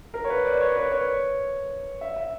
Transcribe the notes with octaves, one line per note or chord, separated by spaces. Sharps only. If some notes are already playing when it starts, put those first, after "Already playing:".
A#4
C#5
B4
D5
C#5
B4
C#5
E5
E5